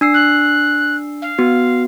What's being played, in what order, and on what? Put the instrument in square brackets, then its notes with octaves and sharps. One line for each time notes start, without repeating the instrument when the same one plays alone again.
[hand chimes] D4 E6 C7
[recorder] F#6
F5
[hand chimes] B3 F#4